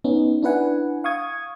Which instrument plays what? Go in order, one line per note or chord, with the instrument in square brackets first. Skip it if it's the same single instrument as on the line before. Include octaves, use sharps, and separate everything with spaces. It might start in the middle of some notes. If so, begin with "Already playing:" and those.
[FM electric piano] B3 C#4 D#4
D4 E4 B4 F#5 G#5
F5 C#6 D#6 G#6